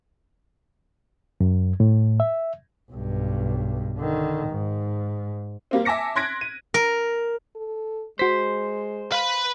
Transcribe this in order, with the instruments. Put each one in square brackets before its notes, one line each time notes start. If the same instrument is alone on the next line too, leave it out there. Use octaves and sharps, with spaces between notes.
[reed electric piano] F#2
A2
E5
[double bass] B1 G2
D3 D#3
G#2
[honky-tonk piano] G3 A#3 C4
E5 G#5 A5 D6 A#6 C#7
C6 F#6 G#6 A#6 B6 D7
D#7
[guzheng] A#4
[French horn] A4
[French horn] G#3 [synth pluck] F#4 B6 [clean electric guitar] C5
[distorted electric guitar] B4 B5 [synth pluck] F5